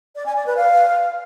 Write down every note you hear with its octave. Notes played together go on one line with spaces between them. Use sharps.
D5
G#5
D5
B4
F5